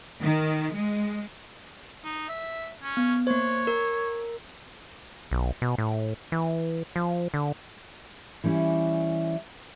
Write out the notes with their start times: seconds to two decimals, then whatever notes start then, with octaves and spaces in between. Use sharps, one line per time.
0.21 D#3
0.73 G#3
2.03 D#4
2.28 E5
2.83 C#4
2.97 B3
3.27 A#3 C5 C#5
3.67 A#4
5.31 B1
5.62 B2
5.78 A2
6.32 E3
6.96 F3
7.34 D3
8.44 E3 G3 C#4 E4